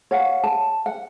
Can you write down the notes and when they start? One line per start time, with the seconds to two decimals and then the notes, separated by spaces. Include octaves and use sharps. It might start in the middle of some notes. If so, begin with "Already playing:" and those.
0.11 C#5 F5 F#5
0.44 A5
0.86 F#5